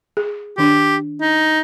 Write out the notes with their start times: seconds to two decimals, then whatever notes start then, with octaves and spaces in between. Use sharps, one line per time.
0.17 G#4
0.58 D#3 D4 G4
1.21 D#4